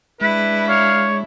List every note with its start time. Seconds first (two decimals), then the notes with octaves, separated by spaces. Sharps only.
0.21 G#3 D4 E4 B4
0.68 C#5 F5